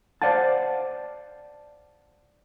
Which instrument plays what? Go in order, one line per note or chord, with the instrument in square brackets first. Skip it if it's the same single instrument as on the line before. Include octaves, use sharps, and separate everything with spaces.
[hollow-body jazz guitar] C5 D5 F5 F#5 A5